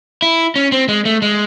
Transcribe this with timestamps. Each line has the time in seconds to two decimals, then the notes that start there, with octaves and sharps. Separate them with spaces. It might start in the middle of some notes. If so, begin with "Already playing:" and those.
0.22 E4
0.56 C#4
0.72 C4
0.88 G#3
1.05 A3
1.22 G#3